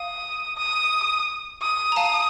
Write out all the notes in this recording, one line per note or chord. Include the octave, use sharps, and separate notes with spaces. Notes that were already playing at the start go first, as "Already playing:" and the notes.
Already playing: F5 D#6
D#6
D#6
A#5
F5 A5